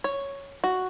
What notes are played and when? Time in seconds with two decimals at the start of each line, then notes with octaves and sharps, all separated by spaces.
0.04 C#5
0.64 F#4